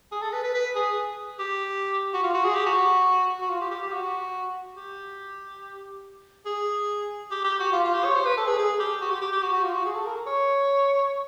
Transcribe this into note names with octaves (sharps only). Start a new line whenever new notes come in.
G#4
A4
B4
B4
B4
G#4
G4
F#4
F4
F#4
G#4
G4
F#4
F#4
F4
G4
G4
G4
F#4
G4
G#4
G4
G4
F#4
F4
F4
G4
C#5
C5
B4
A4
G#4
G#4
G4
F#4
G4
G4
G4
F#4
F#4
F4
F#4
G#4
A4
A#4
C#5